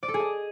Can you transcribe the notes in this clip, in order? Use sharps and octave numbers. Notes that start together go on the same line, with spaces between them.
D5
A4
G#4
D#5